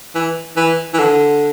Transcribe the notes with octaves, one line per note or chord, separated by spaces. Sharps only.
E3
E3
E3
D3